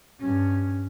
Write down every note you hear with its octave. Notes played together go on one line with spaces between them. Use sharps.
G2 C#4